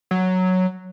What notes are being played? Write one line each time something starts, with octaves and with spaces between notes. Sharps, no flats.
F#3